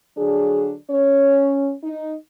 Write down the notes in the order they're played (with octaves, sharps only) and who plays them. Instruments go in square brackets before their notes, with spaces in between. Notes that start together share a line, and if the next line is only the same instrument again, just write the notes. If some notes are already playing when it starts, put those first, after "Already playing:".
[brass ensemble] D3 F#3 D4 [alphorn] G#4
[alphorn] C#4 [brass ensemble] C#5
[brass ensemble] D#4